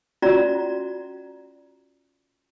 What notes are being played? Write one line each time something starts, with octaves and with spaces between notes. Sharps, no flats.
C#4 F4 F#4 D5 A#5